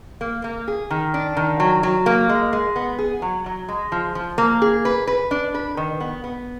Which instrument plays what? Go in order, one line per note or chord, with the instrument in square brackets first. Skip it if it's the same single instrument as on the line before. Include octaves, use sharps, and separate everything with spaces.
[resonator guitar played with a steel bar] A#3
A#3
G#4
D#3
D4
D#3
F#3
F#3
A#3
G#3
G#3
B3
G#4
F#3
F#3
G#3
F3
F3
A#3
G#4
B4
B4
D4
B4
D#3
B3
B3